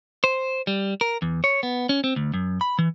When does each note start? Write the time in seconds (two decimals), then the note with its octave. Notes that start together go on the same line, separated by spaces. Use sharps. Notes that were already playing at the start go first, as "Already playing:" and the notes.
0.24 C5
0.67 G3
1.01 A#4
1.22 E2
1.44 C#5
1.63 B3
1.89 C#4
2.04 C4
2.16 D2
2.34 F#2
2.61 B5
2.79 E3